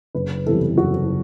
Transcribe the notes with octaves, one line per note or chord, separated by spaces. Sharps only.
F#1 B4
E2 C3 E3 G3 A4
F#1 F#4